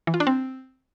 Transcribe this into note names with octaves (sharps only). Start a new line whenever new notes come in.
E3
F4
D4
C4